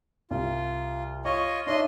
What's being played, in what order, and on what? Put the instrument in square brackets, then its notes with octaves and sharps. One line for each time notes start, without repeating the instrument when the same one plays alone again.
[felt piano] C2 [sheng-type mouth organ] F4
[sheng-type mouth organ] F4 C#5 D#5 [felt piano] C#6
[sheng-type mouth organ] D4 D#5 C6 [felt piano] D#4 C#5 E5